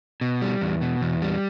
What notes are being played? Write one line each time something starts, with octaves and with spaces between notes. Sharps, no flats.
B2
G3
E2
B2
E2
G3